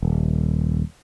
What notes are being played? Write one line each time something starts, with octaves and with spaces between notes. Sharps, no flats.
D#1